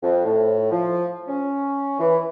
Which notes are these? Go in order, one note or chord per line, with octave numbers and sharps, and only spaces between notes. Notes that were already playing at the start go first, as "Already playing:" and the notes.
F2
A2
F3
C#4
E3